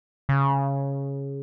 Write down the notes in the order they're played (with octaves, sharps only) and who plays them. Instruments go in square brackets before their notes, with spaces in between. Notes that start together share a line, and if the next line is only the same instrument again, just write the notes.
[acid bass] C#3